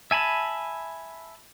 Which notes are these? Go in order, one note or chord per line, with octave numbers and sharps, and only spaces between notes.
E5 G#5 A5 B5